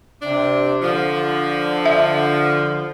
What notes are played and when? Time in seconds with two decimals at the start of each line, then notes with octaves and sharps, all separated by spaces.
0.22 C3 D4
0.82 D3 F3
1.86 E5